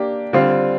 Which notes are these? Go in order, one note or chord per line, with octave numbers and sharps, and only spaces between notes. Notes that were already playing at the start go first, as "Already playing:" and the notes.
Already playing: A#3 D4 G4
D3 G3 C4 F4